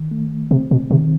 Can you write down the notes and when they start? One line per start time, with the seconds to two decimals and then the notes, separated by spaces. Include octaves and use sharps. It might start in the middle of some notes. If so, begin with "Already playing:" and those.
Already playing: D#3
0.11 A3
0.51 C3 C4
0.71 B2
0.91 C3 D#3